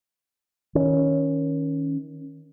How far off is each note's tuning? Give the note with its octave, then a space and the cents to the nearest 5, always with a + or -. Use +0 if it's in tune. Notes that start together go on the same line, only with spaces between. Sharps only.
D#3 +20 C#4 +0